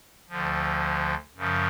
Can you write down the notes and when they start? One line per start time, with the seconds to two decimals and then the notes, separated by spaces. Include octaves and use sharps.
0.29 D2 D3 F3
1.36 F#2 C#3 F3